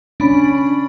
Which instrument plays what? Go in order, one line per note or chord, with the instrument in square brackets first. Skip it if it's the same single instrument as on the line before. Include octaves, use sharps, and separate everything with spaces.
[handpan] C#4 [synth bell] D4 B5